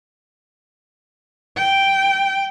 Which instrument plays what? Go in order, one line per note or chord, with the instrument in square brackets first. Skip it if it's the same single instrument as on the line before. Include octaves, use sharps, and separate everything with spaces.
[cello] G5